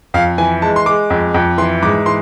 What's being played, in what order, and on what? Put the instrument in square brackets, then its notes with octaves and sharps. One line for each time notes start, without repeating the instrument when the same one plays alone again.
[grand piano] F2 F5
E3 G#5
G#3 A5
C6
G#3 D6
F2
F2
E3 C6
G#2 D6
E3 C6